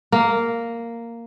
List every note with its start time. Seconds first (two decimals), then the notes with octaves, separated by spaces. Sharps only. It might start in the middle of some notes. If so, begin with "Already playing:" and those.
0.12 A#3